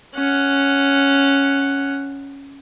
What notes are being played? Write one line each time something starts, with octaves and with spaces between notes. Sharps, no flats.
C#4 F#5